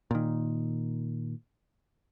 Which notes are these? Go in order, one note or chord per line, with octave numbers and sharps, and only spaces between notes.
A#2 D#3